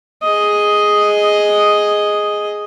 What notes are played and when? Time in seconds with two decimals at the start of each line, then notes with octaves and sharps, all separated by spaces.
0.23 G#4 D#5